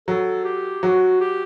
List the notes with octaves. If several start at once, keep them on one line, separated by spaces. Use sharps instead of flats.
F#3 A4
G4
F#3 F#4
G4